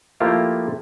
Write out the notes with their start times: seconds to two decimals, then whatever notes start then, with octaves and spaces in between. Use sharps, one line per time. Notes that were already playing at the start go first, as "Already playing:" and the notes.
0.20 F3 A3 A#3 E4 F4 G4